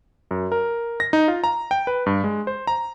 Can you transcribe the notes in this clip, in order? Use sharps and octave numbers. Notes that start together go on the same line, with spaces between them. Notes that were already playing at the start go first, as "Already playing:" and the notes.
F#2
A#4
A#6
D#4
F4
A#5
G5
B4
G2
G#3
C5
A#5